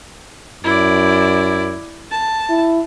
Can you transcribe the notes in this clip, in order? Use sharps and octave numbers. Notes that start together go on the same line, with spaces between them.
F#2 E4 D5
A5
E4